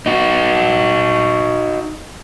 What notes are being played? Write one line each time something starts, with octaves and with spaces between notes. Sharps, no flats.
D#4 F#4